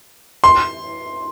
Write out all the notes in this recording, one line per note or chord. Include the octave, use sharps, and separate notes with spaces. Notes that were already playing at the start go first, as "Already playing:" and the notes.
C6